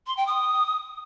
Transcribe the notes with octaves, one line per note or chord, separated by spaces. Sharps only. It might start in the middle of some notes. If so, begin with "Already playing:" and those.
C6
G5
D#6